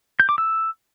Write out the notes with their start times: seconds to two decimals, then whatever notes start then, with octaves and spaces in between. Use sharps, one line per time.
0.20 G6
0.29 D6
0.38 E6